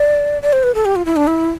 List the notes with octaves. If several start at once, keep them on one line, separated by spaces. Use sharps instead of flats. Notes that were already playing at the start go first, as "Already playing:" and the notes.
Already playing: D5
D5
C5
B4
A4
G4
F4
E4
D4
E4